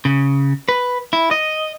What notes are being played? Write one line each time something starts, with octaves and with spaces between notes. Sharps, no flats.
C#3
B4
E4
D#5